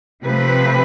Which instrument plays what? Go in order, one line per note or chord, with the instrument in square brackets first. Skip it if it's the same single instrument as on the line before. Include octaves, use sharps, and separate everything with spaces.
[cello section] C3 F3 A3 C4 B4